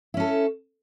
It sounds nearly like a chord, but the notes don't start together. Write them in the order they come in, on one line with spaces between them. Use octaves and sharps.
E4 C#4 A4